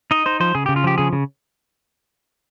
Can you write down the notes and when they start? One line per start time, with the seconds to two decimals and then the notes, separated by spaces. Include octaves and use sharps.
0.11 D#4 D#5
0.26 D#4 C5
0.40 F3 C5
0.55 C#3 G#4
0.66 C#3 G4
0.76 F4
0.84 F3 G4
0.98 C#3 G#4
1.13 C#3